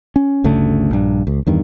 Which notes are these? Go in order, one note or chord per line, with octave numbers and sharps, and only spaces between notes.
C#4
G1 D2 C#3 A3
A#1 G2
C#2
E2 G2 D#3